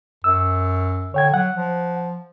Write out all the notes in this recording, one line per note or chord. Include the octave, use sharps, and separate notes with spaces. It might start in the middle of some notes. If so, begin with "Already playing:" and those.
F#2 E6
D3 C#5 G5 G#6
F#3 F#5
F3